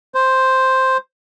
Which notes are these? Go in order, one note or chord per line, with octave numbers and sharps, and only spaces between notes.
C5